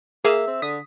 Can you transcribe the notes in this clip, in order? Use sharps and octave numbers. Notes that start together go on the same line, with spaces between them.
A#3 G#4 E5
C4
D3 D#6 B6